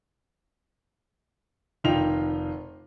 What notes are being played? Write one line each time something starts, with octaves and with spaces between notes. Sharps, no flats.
F1 D#3 D#4 F4 G5 F7